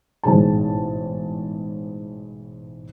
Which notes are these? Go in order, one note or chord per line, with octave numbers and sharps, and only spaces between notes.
A1 G#2 B2 G#4 A5